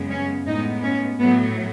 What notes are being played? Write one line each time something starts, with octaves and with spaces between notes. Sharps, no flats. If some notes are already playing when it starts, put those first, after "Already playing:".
Already playing: F#2 C#3 G#3 B3
C#4
A2 G#3 B3 D#4
C#4
A2 F#3 A3 B3